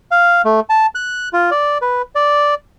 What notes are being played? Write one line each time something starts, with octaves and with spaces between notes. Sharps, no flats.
F5
A3
A5
F#6
F4
D5
B4
D5